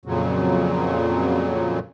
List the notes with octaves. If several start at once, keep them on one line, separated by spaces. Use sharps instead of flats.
F2 A#2 C#3 F#3